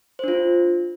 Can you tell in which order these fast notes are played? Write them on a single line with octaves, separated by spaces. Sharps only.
C5 D4 F4